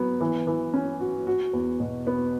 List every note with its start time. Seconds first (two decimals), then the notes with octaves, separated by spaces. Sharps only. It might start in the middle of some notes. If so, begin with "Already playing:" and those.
Already playing: F#3 B3
0.20 E3
0.47 E3
0.74 C#4
1.00 F#4
1.27 F#4
1.53 E2
1.80 B2
2.07 B3